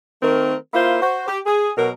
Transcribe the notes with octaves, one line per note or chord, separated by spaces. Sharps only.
D#3 A3 C4 A#4
A#3 E4 F4 C5
F#4 C5
G4
G#4
B2 F#3 A#4